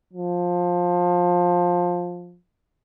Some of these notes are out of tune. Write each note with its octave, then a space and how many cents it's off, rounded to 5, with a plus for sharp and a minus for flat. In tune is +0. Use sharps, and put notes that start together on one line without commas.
F3 +15